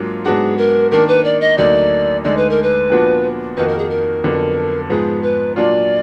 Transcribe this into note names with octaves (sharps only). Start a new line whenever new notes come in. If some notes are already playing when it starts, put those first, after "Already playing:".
Already playing: G#2 F#3 A#3 D4 F4
G#2 F#3 B3 D4 F#4 G#4
A#4
D#3 A#3 D4 A#4
B4
D5
D#5
D2 D3 F#3 A#3 D#4 D5
D2 D3 G#3 D#4 D5
B4
A#4
B4
A#2 F3 B3 D4 F#4
F2 D#3 A#3 D#4 F#4 B4
A#4
G#4
A#4
F2 D3 F#3 B3
G#2 F3 B3 G#4
B4
A#2 F#3 D4 F4 D5